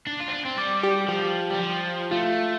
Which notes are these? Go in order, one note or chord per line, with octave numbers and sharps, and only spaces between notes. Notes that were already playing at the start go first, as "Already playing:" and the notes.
D4
F4
C4
D4
C4
G3 D5
G4
F3 G4
G3
F3
A3 F4